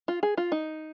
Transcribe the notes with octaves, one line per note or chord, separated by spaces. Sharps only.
F4
G#4
F4
D#4